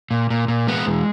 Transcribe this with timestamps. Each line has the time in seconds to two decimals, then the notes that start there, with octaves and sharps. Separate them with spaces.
0.11 A#2
0.30 A#2
0.48 A#2
0.68 G#3 B3
0.86 E2